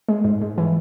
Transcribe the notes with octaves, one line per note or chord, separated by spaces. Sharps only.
G#3
G#2
G#2
E3